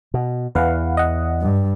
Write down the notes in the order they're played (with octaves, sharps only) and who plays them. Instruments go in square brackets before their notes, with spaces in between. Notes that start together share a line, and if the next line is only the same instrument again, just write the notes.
[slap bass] B2
[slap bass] E2 E3 [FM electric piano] B4 F5 F#5
[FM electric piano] D#5 F#5
[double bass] G2